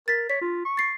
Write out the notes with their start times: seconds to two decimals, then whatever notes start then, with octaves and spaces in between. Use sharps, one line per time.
0.08 A#4 A6 B6
0.30 C#5 B6
0.41 F4
0.65 C#6
0.77 A6 C7